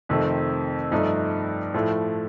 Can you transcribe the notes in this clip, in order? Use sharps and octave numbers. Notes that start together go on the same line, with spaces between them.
F2 C3 D#3 A3 C4
G2 F3 A3 D#4
A2 F3 A3